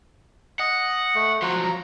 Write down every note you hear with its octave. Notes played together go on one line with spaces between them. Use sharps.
D#5 F#5
A3
F3 F#3 F#5 C6
A#5